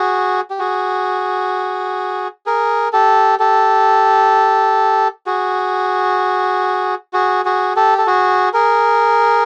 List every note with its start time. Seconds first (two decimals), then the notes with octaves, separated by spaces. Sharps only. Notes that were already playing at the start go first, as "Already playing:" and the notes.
Already playing: F#4 G#4
0.50 G4
0.59 F#4 G#4
2.46 G#4 A#4
2.93 G4 A4
3.40 G4 A4
5.26 F#4 G#4
7.13 F#4 G#4
7.45 F#4 G#4
7.76 G4 A4
7.98 A4
8.07 F#4 G#4
8.53 G#4 A#4